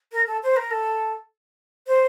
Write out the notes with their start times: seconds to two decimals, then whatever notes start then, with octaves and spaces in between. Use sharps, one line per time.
0.12 A#4
0.27 A4
0.43 C5
0.56 A#4
0.71 A4
1.87 C5